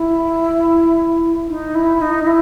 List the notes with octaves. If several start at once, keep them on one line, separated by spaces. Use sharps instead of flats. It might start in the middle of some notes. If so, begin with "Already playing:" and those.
Already playing: E4
D#4
E4
D#4
D#4
E4